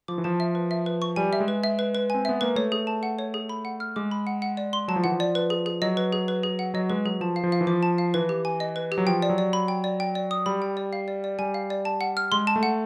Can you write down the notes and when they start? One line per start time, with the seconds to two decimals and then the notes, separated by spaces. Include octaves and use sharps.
0.08 F3 D6
0.18 E3
0.24 F3 A5
0.40 E5
0.55 B4
0.71 E5
0.86 B4
1.02 C#6
1.16 G3 G#5
1.33 E5
1.40 G#3
1.48 B4
1.64 E5
1.79 B4
1.95 B4
2.10 C4 G#5
2.25 B3 E5
2.41 A#3 B4
2.56 A3 C#5
2.72 G#4
2.87 A5
3.03 F#5
3.19 C#5
3.34 G#4
3.49 B5
3.65 F#5
3.80 F6
3.96 G#3 D6
4.11 B5
4.27 F#5
4.42 F#5
4.57 D5
4.73 C6
4.88 F#3 A5
4.96 F3
5.04 E3 F#5
5.12 F3
5.20 D5
5.35 B4
5.50 G#4
5.66 G#4
5.82 F#3 D#5
5.97 B4
6.13 G#4
6.28 B4
6.43 G#4
6.59 F#5
6.74 F#3 D#5
6.90 G#3 B4
7.05 F#3 G#4
7.21 F3 A5
7.36 F5
7.44 F3
7.52 F5
7.61 E3
7.67 F3 D6
7.83 A5
7.98 F5
8.14 E3 B4
8.29 G4
8.45 G#5
8.60 D#5
8.76 B4
8.92 G4
8.98 F#3
9.07 F3 G5
9.22 D5
9.30 F#3
9.38 D5
9.53 B5
9.68 G5
9.84 D5
10.00 G5
10.15 D5
10.31 D#6
10.46 G3 B5
10.62 G5
10.77 D5
10.93 F5
11.08 D5
11.24 D5
11.39 G3 G#5
11.54 F5
11.70 D5
11.85 A5
12.01 F#5
12.17 F6
12.32 G#3 C6
12.47 A5
12.56 A3
12.63 F#5